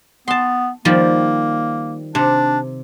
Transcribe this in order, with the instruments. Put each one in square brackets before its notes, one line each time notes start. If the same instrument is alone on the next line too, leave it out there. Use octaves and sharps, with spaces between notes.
[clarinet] B3 [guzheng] A5 C6
[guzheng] D#3 F3 G3 [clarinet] A#3
[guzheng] C3 [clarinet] D4